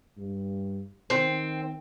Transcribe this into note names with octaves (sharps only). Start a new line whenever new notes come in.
G2
D#3 C4